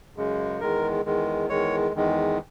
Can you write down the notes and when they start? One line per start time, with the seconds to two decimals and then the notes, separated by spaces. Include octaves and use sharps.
0.17 F#2 C#3 G#3
0.60 E2 D#3 G#3 A#4
1.05 E2 D#3 G#3
1.49 E2 D#3 G#3 C#5
1.94 E2 D#3 G#3